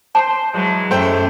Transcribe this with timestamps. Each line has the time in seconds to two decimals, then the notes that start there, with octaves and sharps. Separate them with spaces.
0.15 C5 A5
0.55 E3 F#3 G#3
0.91 F#2 A3 C5 G5